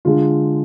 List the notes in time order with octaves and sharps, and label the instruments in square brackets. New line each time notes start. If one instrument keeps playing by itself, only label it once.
[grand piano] D3 G#3 F4